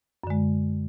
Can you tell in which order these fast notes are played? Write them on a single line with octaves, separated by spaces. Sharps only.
F#2 D3 G#3